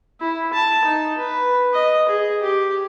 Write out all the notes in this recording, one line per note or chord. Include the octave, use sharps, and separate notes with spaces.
E4
A5
D#4
B4
D#5
G#4
G4